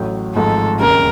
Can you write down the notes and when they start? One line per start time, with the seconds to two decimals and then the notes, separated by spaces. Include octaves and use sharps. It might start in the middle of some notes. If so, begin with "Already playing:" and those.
Already playing: A1 A2 F#3
0.36 G#1 G#2 F3 A3 A4
0.81 E1 D#2 C#3 A#4